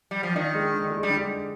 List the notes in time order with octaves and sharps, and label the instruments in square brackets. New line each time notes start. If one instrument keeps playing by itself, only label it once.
[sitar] G3
F3
[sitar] D#3 [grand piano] D4
[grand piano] G#3
D3
G#3
[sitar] G3
[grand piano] D3